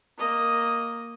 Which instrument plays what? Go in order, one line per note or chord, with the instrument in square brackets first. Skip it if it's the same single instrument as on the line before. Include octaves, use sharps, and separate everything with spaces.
[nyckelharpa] A#3 D#5